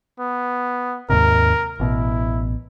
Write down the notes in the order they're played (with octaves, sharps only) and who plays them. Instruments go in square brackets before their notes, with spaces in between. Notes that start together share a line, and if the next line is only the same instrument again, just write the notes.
[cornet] B3
[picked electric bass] D#2 G#2 C3 [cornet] A#4
[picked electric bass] A1 B2 [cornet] E4